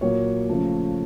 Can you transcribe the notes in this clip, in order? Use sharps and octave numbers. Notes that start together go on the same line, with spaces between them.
A#2 F#3 A#3 C#5
C#3 F3 A3